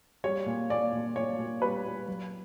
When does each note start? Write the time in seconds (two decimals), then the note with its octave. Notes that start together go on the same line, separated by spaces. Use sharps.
0.24 G3 C#5
0.46 A#2
0.70 A#2 D5
0.93 A#2
1.16 A#2 C#5
1.39 A#2
1.62 G3 B4
1.85 G3
2.08 F#3